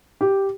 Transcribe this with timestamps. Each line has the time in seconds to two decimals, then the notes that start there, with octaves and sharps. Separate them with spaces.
0.21 G4